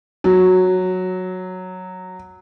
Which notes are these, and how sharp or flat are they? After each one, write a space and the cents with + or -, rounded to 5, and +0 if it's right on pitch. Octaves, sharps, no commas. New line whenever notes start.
F#3 -5